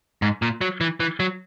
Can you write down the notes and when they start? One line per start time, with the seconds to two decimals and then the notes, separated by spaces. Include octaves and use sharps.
0.22 G#2
0.42 A#2
0.61 F#3
0.81 E3
1.00 E3
1.20 F#3